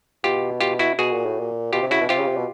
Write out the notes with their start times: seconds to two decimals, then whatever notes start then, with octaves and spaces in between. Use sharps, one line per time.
0.24 B2 F4 G4
0.61 F4 G4
0.79 E4 F#4
0.98 B2 F#4 G#4
1.12 A#2
1.25 A2
1.40 A#2
1.73 B2 F4 G4
1.82 C3
1.91 C#3 E4 F#4
2.01 B2
2.09 C3 F4 G4
2.19 C#3
2.27 C3
2.37 B2